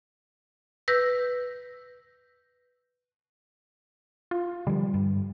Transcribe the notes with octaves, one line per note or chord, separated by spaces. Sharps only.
B4 E6 G6 A#6
F4
D3 F3 G3
G2